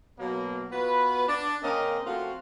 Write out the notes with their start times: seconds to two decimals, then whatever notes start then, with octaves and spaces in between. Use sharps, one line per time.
0.18 B2 F#3 A#3
0.71 B3 F4 F#4 B4
1.28 D4
1.63 C#3 A#3 C4 C#4 A#4 D#5
2.06 F3 A3 C4 F4 F#4